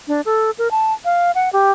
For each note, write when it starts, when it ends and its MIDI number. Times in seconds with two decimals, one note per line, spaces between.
0.08 0.21 62
0.25 0.51 69
0.58 0.70 70
0.71 0.93 81
1.05 1.31 77
1.35 1.52 78
1.53 1.72 67